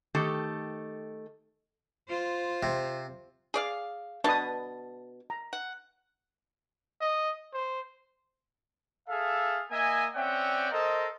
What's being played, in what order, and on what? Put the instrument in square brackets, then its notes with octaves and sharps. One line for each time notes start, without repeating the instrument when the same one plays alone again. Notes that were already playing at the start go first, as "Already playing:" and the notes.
[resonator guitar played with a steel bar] D#3 A3 G4 A4
[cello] F4 C5
[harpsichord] C3
[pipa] G#4 D5 F5
[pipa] B2 A5 [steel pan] D4 B4 D#6
[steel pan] A#5
[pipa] F#5
[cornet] D#5
C5
[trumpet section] G#4 A4 E5 F5
A#3 D#5 E5 G#5
C4 C#4 D5 E5 F#5 G5
A4 A#4 C5 D#5